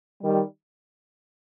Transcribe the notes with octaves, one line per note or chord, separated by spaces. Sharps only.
D#3 G3